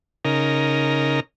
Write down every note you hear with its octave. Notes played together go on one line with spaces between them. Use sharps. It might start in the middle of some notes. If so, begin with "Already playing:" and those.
C#3 D#4 A#4